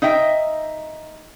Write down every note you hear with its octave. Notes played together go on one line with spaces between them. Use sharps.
D#4 D#5 E5 G5